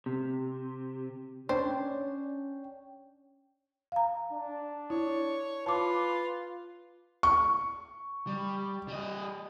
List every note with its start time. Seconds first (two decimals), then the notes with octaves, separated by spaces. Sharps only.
0.06 C3
1.49 C#4 D4 C5 C#5 G5
3.92 F5 A#5
4.33 D4
4.90 E4 C#5
5.66 F4 B4 A5 D6
7.23 C#6
8.27 G3
8.88 G3 D#5